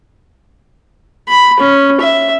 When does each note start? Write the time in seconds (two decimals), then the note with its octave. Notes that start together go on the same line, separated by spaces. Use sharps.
1.28 B5
1.60 C#4
2.00 E5